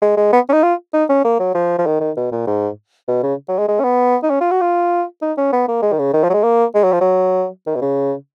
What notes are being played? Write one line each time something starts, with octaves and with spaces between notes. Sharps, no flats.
G#3
G#3
B3
C#4
D#4
F4
D#4
C#4
A#3
F#3
F3
F3
D#3
D#3
B2
A#2
G#2
B2
C#3
F#3
G#3
G#3
C#4
B3
D#4
C#4
F4
F#4
F4
D#4
C#4
B3
A#3
G#3
D#3
C#3
D#3
F3
F#3
G#3
A#3
G#3
F#3
F3
F#3
D#3
B2
C#3